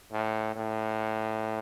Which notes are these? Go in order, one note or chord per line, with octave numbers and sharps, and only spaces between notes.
A2
A2